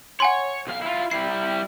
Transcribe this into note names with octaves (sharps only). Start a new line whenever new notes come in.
C#5 F#5 G#5 C6
B1 F5
E4 F4
G3 E4 C7